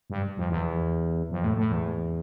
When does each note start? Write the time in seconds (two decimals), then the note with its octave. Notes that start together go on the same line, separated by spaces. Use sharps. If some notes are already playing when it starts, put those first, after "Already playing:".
0.10 G2
0.37 F2
0.50 E2
1.31 F2
1.44 A2
1.57 A2
1.72 E2